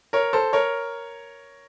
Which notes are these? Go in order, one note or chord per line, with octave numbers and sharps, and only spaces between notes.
A#4 C#5
A4 C5
A#4 C#5